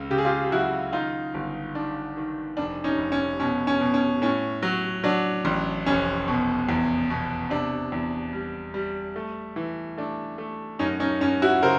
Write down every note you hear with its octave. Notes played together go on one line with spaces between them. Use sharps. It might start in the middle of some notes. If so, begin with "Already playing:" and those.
Already playing: C#2 C#3
C#3 G4
G#4
F4 G4
G4
F#3 E4 F#4
D#3 D#4 F4
G1
D#3 D4
D#3
F1 D4
C#4 D#4
F1
C#4
B2 C#4
C#4
B2
C#4
A2 C#4
F#3
F#3 D4
A1
F1 C#4
B2
E2
B2
C3 D4
E2
G3
G3
A3
E3
A3 D4
A3
F#2 C#4 D#4
C#4 D#4
F#2 C#4
E4 F#4
C#3 A#4 C5